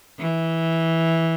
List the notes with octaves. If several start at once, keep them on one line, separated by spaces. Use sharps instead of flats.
E3